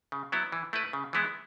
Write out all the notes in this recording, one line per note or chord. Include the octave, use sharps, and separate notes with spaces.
C#3
F#3 B3 E4
E3
A3 E4 B4
C#3
E3 G#3 B3 E4